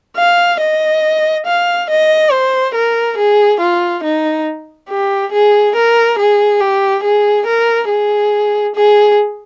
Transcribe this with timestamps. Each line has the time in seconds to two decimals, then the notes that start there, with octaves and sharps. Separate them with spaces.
0.17 F5
0.60 D#5
1.46 F5
1.90 D#5
2.32 C5
2.75 A#4
3.18 G#4
3.60 F4
4.04 D#4
4.90 G4
5.33 G#4
5.76 A#4
6.19 G#4
6.61 G4
7.04 G#4
7.46 A#4
7.89 G#4
8.76 G#4